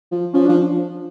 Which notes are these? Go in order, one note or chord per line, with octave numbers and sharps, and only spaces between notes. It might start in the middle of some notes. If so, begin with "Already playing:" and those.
F3
F3 C#4
F3 D4